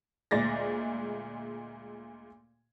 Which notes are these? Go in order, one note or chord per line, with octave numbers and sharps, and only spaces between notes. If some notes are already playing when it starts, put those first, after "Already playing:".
D2 A#2 G#3 D5 A6 A#6